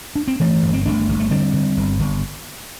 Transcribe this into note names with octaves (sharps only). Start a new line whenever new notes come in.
D4
C4
G2 E3 A3
G1
C4
G1 A3 D4
G1
A3
D3 G3 C4
D3
G1
G1